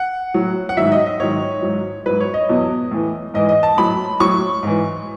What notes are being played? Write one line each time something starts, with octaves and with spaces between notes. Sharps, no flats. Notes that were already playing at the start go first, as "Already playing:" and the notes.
Already playing: F#5
A2 F#3
F#5
G#2 D#3 F#3 E5
D#5
D#5
G#2 D#3 F#3 C#5
G#2 F#3
G#2 F#3 B4
C#5
D#5
E2 B2 F#3
A2 E3
G#2 E3 D#5
D#5
A5
A2 F#3 B5
A2 F#3 C#6
G#2 E3